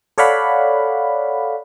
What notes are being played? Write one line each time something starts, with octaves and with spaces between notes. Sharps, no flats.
A4 C#5 D5 F5 F#5 B5